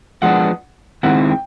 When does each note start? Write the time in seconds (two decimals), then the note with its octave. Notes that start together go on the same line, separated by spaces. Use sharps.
0.22 F3 G#3 B3 D4 F#5
1.03 D#3 G#3 C4 E4 F#5
1.30 G5